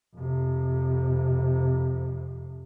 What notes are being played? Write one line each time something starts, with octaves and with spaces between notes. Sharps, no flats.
F2 C3